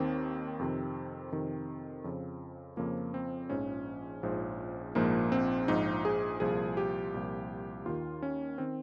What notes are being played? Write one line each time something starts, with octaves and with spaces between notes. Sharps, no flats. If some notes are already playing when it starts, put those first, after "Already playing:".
Already playing: D#2 D#3 C4
F2 C3 D#3
F2 C3 D#3
F2 C#3 F3
F2 C#3 F3 A#3
C4
A#1 G#2 F3 C#4
A#1 G#2 F3
A#1 G#2 F3 A#3
C4
A#1 G#2 F3 D#4
G#4
C2 A#2 F3 G#4
G4
C2 A#2 F3
D#2 D#3 F4
C#4
D#3 C4